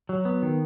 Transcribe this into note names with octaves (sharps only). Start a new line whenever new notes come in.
F#3
B3
D#3